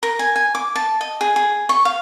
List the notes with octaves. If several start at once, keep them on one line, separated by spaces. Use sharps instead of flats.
A#4
G#5
G#5
D6
A5
D#5
G#4
G#4
C#6
F5